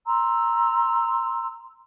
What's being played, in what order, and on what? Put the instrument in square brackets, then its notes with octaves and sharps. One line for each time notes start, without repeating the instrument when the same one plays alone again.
[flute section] A#5 C6 E6